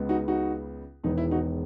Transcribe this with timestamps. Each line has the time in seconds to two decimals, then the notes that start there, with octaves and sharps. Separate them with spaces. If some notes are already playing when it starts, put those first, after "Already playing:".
Already playing: C#2 C#3 G#3 B3
0.09 D#4 F#4
0.28 D#4 F#4
1.04 E1 E2 D#3 G#3 B3 D#4
1.18 E4
1.31 D#4 F#4